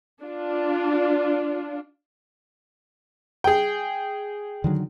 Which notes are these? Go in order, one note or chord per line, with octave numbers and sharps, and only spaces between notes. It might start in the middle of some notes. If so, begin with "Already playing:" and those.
D4 F4
G#4 G5
D3 D#3 F#3